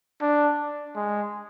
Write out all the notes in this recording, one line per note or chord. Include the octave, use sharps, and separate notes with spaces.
D4
G#3